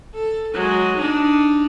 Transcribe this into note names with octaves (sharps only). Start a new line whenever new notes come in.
A4
F#3 G#3
D4 D#4